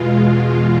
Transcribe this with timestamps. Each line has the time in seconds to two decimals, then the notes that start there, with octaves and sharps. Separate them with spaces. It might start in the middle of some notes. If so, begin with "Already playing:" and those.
Already playing: E2 B2 G#3 F4
0.20 F4